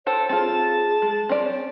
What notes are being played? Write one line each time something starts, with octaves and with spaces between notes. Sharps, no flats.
A4 C5 C#5 G5
C4 F4 G#4 A5
G#3
C4 C#4 D5
C#5